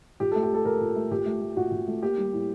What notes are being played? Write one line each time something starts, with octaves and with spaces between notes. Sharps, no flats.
A#2 G4
A4
A3
G4
A3 A4
A#2 A#4
A#2
A3
A#2 G4
A3
A3
A#2 F#4
A#2
A3
A#3 G4
G3
A2